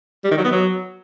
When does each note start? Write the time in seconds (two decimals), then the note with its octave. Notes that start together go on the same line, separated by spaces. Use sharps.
0.24 G3
0.31 D#3
0.38 F#3
0.45 B3
0.51 F#3